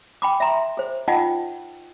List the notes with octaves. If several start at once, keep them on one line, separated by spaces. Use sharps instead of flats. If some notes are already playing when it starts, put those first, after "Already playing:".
G5 B5 D6
E5 A#5 C6
G#4 C5
D#4 F4 D#5 F#5 G5